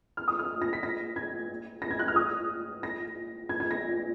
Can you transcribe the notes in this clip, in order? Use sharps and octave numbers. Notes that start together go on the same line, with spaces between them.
F6
D#6
F6
A#6
B6
A#6
G#6
A#6
G#6
F#6
F6
D#6
A#6
G#6
G#6
A#6